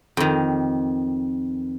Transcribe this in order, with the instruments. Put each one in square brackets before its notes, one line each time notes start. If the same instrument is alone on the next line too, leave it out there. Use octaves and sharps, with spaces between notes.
[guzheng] F2 D#3